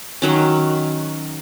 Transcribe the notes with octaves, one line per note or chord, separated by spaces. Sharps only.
D#3 F#3 C#4